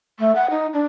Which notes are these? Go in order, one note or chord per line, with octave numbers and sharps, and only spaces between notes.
A3
F#5
D#4
D4